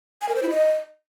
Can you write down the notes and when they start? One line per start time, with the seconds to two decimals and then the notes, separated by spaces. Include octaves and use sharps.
0.21 G#5
0.29 A#4
0.36 C5
0.43 E4
0.50 D#5